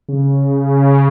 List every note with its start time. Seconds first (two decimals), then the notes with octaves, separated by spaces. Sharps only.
0.09 C#3